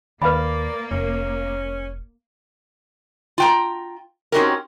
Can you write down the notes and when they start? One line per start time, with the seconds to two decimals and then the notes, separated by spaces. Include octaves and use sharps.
0.22 D#2 A#3 B4 D5 F5 B5
0.91 F1 C#4
3.38 F4 G5 A#5
4.32 C4 C#4 D#4 F#4 G4 A#4